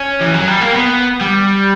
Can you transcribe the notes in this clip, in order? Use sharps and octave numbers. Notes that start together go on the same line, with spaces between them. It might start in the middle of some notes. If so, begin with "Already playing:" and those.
Already playing: C#4
E3
F#3
G3
A#3
B3
G3